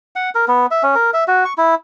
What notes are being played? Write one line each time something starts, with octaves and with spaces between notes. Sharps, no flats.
F#5
A#4
B3
E5
C#4
A#4
E5
F#4
C#6
E4